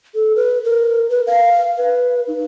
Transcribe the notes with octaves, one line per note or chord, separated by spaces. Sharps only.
A4
B4
A#4
B4
F5
B4
D#4